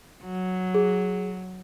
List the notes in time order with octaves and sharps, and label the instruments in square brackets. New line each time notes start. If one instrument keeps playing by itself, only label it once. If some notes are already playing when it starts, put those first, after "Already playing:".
[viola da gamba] F#3
[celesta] G#4